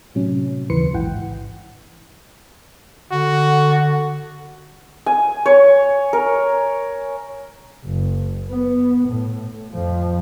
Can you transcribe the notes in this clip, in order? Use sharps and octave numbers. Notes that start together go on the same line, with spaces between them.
A2 C3 F#3 C#4
D#2 C#3 E3 B4 C6 C#7
A1 G#2 E4 F#5 G5
D3 F#4
G#5
C#5
A#4
F#1
B3
A2
F2 F3